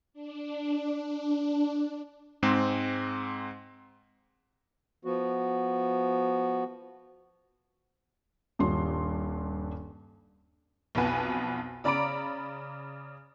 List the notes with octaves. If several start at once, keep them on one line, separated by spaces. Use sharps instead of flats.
D4
D4
G#2 G#3 C4
F3 B3 F#4
D#1 G2 C6
B1 F2 B2 B3 B4 G#5
C#3 D5 A#5 B5 D6 D7